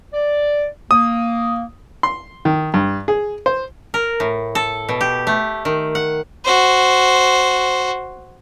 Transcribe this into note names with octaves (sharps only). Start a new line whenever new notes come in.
D5
A#3 D#6
C6
D#3
G2
G#4
C5
A#4
A2
A4
B2
G4
A3
D#3
F#5
F#4 C5